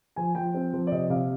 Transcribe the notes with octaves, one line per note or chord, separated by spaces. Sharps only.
F3 G#5
F3 G5
C4
F3
D5
C3 D#5
C3 F5